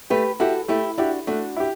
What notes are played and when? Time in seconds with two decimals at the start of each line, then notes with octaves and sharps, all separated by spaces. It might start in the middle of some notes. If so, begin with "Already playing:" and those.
0.10 A3 G4 B4
0.40 E4 F#4 G4 A4
0.68 A3 E4 G4
0.98 D4 E4 F#4 G4
1.27 A3 D4 F#4
1.56 E4 G4